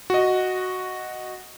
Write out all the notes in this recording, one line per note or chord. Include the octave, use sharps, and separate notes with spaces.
F#4 D#5